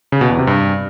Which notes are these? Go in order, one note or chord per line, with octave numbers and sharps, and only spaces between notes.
C#3
B2
E2
C3
G2